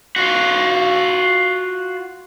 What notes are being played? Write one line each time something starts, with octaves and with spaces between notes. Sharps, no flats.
F4 F#4